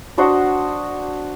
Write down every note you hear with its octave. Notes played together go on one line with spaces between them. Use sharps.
D4 F#4 C5 D#5